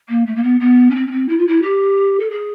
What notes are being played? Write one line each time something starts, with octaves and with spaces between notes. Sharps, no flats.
A#3
A3
A#3
B3
B3
C#4
C4
C#4
C4
E4
F4
E4
G4
A4
G#4